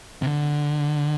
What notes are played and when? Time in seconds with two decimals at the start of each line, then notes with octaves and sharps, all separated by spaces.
0.22 C3
0.27 D3